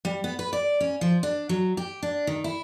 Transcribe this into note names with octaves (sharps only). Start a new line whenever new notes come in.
G3
B3
B4
D5
C#4
F3
D4
F#3
G4
D4
D#3
E4